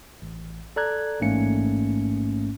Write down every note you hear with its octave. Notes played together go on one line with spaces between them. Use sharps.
A1
A4 D5 A#5 F#6 G#6
A1 G#2 A3 A#3 C#4 C#7